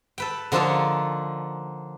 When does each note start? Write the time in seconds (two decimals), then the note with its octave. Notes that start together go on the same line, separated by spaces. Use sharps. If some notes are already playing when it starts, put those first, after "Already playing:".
0.18 A4 B4 G5
0.52 D3 F3 A#3 D#4 A4 C#5